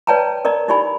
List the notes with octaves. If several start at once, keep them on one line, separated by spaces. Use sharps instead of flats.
B4 C#5 D5 G5 A5 A#5
A#4 D5 D#5 A#5
D#4 E4 G4 D5 G#5 B5